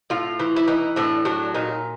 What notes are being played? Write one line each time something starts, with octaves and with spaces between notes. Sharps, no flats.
A2 F4
E3
E4
E3 D#4
A2 D4
F#3 D4
A#2 D#4